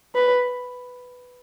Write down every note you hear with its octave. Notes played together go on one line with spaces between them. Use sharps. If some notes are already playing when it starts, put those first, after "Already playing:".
B4